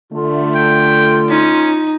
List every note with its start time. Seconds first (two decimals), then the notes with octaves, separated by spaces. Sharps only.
0.12 D3 A3 F4
0.55 G5
1.30 C#4 D#4